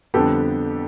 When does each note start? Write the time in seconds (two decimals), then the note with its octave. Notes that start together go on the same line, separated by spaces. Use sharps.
0.14 F2 D3 G3 B3 G4 A4